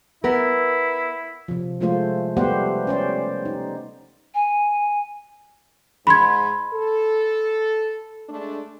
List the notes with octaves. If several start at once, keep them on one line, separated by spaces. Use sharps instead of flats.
B3 E4 A#4
C3 F3
F3 G#3 A3 F4 C5
G3 A3 B3 G4 C5 F#5
C#4 C5 D5
D#4
G#5
G#2 B5 C6 G#6
A4
G#3 A3 D4